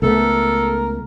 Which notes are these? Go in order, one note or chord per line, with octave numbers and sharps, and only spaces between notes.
C#2 A3 B3 A4 A#4